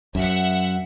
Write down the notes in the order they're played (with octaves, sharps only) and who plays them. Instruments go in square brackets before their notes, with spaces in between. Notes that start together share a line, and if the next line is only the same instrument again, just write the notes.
[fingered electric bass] F#2 [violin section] E5 F#5